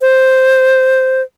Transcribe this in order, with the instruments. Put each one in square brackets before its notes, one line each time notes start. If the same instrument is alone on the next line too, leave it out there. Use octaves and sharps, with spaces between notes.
[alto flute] C5